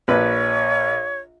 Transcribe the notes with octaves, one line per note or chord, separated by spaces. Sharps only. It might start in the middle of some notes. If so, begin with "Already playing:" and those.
A#1 B4 C#5 B5